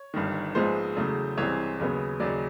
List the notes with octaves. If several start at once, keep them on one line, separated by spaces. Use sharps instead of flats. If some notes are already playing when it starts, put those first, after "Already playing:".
Already playing: C#5
G1 G2 D#3
A#1 G#2 F3 G#3 B3 C5
E2 C#3 F#3 A3
C2 C3 E3 G#3 C4 C#5
D#2 C#3 F#3 B3
D#2 C#3 F#3 D5